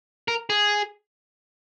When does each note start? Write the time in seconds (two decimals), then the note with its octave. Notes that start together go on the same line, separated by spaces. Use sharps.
0.28 A#4
0.50 G#4